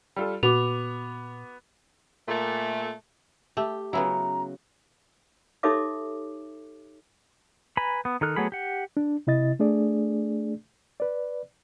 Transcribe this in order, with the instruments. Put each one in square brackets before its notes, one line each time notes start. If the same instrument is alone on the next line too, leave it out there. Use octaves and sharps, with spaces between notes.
[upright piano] G3 F4 A4
[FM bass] A#2 [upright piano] B3 [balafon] F#4 [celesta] D6 F7
[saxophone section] A#2 A3
[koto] A3 [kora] G4
[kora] C#3 F#3 [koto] B3 C#4 E4 [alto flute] A#5
[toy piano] D#4 G4 A4 C#5 E5 D6
[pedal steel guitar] B4 G#5 A#5 B5
B3
D#3 D#4 A4 F6 F#6
F#3 A3 B3 G#4 B5
G4 F#5
[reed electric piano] D4
C3 E4 D#5 A6
A3 D4 G#4 D5
B4 D5